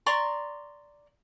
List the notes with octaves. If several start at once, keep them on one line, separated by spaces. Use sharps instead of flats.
D5 A#5 C6 C#6